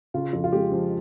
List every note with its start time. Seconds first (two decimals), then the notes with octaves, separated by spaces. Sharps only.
0.14 C#3 F4
0.33 F2
0.44 F4
0.52 G#3 G4
0.72 F3